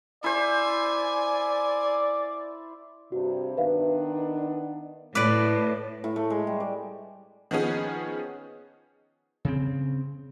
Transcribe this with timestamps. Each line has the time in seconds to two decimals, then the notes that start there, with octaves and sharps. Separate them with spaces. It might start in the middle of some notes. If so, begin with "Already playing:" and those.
0.24 E4 C5 D5 G#5
3.12 G2 C3 F#4
3.57 D#3 B3 D4 B4 E5 F5
5.15 A2 B4 D5 D6
6.04 A2
6.16 A3
6.30 G#3
6.47 G3
6.60 D5
7.51 D#3 F3 B3 C#4 G#4
9.45 C#3 C4